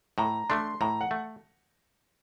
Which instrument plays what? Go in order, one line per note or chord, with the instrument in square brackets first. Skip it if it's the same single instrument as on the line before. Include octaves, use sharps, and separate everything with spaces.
[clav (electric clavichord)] A2 [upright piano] A#5
[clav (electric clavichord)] A3 D4 [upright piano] C6
[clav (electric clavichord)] A2 [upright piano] A#5
[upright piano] F#5
[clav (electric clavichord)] A3